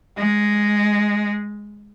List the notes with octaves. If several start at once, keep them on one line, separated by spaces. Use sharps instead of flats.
G#3